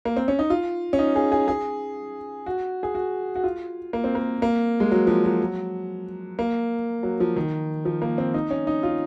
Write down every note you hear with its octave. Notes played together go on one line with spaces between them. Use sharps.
A#3
C4
C#4
D#4
F4
C#4
D#4
G#4
G#4
G#4
F#4
G#4
F#4
F#4
F4
A#3
C4
A#3
A#3
G#3
F#3
F3
F#3
A#3
F#3
F3
D#3
F3
A#3
C4
D#4
C#4
D#4
F4